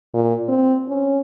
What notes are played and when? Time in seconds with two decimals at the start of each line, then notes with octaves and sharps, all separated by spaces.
0.14 A#2
0.48 C4
0.88 C#4